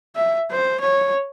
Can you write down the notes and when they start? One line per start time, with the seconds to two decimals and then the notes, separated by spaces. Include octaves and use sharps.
0.16 E5
0.51 C5
0.81 C#5